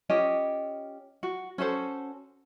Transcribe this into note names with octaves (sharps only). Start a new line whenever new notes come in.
C#4 F4 G4 D#5
F#4
C#4 F#4 A4 C5